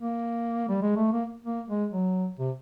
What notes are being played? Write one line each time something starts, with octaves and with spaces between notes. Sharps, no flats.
A#3
G3
G#3
A3
A#3
A#3
G#3
F#3
C3